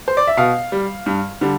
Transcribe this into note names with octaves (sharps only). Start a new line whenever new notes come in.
C5
D5
E5
B2 F5
G3
G2
D3 G3